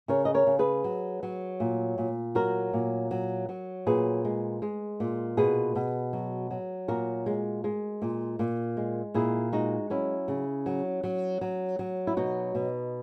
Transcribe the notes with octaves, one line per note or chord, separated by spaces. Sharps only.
C#3 A#4 C#5
D#5
A#4 C#5
C#3
G#4 B4
F#3
F#3
A#2
A#2
F#3 F#4 A#4
A#2
F#3
F#3
A#2 G#4 B4
G#3
G#3
A#2
B2 G#4 B4
B2
F#3
F#3
A#2 F#4 A#4
G#3
G#3
A#2
A#2
G#3
A#2 E4 G#4
G#3 D#4 F#4
F#3 C#4 E4
C#3
F#3
F#3
F#3
F#3
E4
B2 D#4 F#4
B2